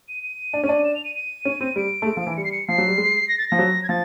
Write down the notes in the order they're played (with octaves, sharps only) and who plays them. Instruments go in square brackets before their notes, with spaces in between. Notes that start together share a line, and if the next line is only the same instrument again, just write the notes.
[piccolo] D#7
D#7
[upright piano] D4
C#4
D4
[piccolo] E7
F7
D#7
D#7
[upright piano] C#4
C4
[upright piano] G3 [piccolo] D7
[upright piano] A3
G#3
F3
E3
[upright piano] G3 [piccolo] C#7
[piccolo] C7
C#7
[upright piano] F3 [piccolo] C7
[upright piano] F#3
G3
G#3
[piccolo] A#6
A6
[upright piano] F3 [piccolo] A#6
[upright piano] F#3
[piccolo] G#6
[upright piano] F3 [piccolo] A6